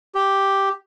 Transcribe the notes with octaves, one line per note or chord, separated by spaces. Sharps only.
G4